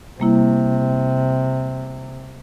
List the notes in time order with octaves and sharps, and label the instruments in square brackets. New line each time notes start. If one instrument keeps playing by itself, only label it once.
[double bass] C3 [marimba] G3 A#3 E4